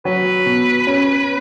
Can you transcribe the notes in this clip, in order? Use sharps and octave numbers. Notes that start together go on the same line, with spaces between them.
F#3 B4
B2
C#4